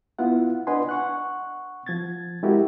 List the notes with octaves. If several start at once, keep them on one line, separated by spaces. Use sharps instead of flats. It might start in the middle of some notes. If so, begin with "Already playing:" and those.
B3 E4 F4 F#5
D4 B4 D#5 F#5 G#5 C6
F#5 C#6 F#6
F3 G#6 A6
G#3 E4 F#4 G4 A#4